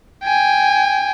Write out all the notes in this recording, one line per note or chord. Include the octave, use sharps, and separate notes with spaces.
G5 G#5